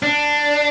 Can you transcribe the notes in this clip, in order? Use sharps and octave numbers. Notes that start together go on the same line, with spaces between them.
D4